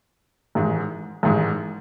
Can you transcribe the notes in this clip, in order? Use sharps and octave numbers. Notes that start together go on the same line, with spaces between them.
A1 G#2 D#3 G#3
A1 G#2 D#3 G#3